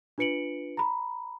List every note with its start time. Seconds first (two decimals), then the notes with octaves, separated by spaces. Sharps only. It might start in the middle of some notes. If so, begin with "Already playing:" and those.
0.18 D4 F4 B4 C#7 D7 F#7
0.77 A#5 B5